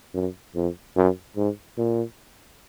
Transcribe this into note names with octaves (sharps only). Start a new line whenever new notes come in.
F#2
F2
F#2
G#2
A#2